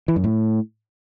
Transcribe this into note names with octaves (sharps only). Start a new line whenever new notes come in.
E3
F#2
A2